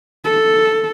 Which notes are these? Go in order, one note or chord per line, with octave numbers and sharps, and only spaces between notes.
A4